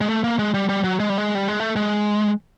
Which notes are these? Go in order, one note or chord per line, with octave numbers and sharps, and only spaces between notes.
G#3
A3
A#3
G#3
G3
G3
F#3
G#3
G3
G#3
G3
G#3
A3
G#3